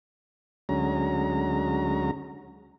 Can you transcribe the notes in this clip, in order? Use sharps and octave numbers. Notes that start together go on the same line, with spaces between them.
D2 F#3 G#3 C#4 A#5